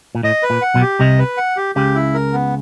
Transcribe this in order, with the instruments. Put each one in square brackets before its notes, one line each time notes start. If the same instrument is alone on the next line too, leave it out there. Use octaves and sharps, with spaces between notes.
[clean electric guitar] A#2
[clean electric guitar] A2 [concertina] D#5
[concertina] B4
[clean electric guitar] A#2
[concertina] F#5
[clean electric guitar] B1 B2
[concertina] G4
[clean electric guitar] C2 C3 [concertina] D#5
[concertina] B4
F#5
G4
[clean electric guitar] C#2 C#3 [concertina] G4
[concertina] E4
A#4
B3